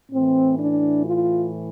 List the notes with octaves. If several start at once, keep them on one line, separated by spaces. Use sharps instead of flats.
A2 E3 C4
D4
F4